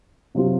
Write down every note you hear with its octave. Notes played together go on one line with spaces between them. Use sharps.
C3 F#3 C4 F4